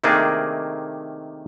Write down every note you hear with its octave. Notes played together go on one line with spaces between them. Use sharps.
C3 D#3 A3 A#3 D4 G#4